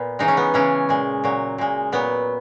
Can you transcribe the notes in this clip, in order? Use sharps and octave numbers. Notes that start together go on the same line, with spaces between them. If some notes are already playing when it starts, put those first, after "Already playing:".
Already playing: A#2 B3
C#3 E3 G#3 D#4
C#4
B3
C#3 E3 G#3 C#4
A#2 G#3
A#2 F#3
A#2 G#3
A#2 F#3 B3